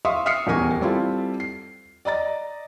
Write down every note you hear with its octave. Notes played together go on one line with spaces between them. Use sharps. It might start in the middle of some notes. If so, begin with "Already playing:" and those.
E5 F5 C6 C#6 D#6
E5 D#6 F6 C7 C#7
D#1 E2 A#4 G#5 C#6
G3 C4 E4 F4 A4
C7
D5 D#5 A#5 A6